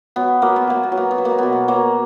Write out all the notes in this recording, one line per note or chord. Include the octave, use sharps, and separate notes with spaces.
F#3 B3
F#3 A#3
B3
F#3 A#3
B3
F#3
A#3
B3
F#3
A#3
B2 B3
A#3
F#3 A#3